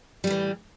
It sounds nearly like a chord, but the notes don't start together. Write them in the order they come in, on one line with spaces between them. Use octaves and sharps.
G3 A2 E3